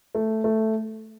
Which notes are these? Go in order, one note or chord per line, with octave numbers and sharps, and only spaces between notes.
A3
A3